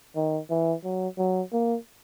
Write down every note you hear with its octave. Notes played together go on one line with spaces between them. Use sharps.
D#3
E3
F#3
F#3
A#3